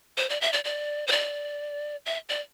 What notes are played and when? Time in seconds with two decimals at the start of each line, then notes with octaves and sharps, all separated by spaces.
0.17 C5
0.30 D5
0.41 E5
0.53 D5
0.65 D5
1.08 C5
1.12 D5
2.06 E5
2.29 D5